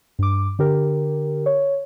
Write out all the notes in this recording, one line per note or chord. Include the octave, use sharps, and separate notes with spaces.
G2 D6
D3 G4 A#4
C#5